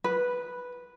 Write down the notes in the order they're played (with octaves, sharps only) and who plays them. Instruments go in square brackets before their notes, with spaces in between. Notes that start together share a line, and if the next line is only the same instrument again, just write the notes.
[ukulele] B4